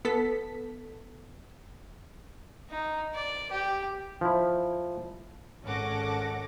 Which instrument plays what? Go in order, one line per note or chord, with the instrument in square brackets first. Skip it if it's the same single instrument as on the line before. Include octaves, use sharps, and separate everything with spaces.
[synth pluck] B3 A4 B6
[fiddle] D#4
D5
G4
[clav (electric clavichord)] F3 E4
[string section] G#1 C#4 A4 F#5 D6 A#6